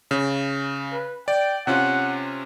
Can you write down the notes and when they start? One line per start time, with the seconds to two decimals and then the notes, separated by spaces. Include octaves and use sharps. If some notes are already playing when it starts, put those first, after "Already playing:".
0.11 C#3
0.92 B4
1.28 D5 G5
1.67 C3 C#4 F4 F#5